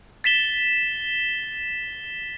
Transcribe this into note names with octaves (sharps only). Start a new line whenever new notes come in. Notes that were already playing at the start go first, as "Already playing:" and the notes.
A6 B6 E7 G7